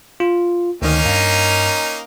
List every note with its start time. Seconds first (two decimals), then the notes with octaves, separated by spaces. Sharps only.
0.20 F4
0.82 D2 D#3 A#3 C#4 D#4
1.05 G2